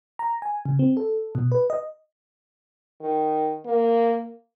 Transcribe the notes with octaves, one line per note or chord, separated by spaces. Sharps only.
A#5
G#5
C#3
C4
A4
B2
B4
D#5
D#3
A#3